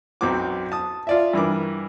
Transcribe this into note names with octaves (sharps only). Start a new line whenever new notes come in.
B1 F#2 C4 F#4 D6
A5 D#6
F4 D5 E5
G2 E3 A#4 D6